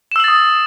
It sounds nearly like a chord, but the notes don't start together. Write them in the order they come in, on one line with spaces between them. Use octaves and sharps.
E7 E6 F#7 A6 D#6